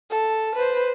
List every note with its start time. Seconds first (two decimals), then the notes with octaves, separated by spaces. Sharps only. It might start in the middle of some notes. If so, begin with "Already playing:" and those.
0.11 A4
0.55 B4 C5